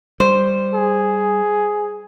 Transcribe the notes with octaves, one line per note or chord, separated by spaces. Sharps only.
G3 C5
G#4